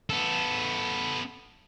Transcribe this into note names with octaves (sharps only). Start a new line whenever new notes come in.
B3 A4